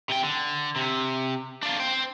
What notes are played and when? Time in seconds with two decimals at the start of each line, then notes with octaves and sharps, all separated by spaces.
0.09 C3 G5
0.23 D3
0.76 C3
1.63 D4 F4
1.80 C5 G5